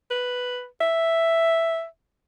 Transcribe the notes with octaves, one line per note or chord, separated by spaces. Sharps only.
B4
E5